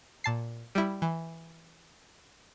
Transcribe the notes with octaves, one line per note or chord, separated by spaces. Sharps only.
A#2 A5 C7
G3 E4
E3